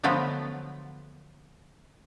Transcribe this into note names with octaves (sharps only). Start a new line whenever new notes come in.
D3 F3 F#3 A3 B3